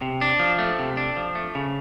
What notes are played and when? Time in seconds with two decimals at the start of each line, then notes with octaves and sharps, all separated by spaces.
0.02 C3
0.21 D4
0.39 F3
0.59 A3
0.79 C3
0.97 D4
1.17 F3
1.35 A3
1.55 C#3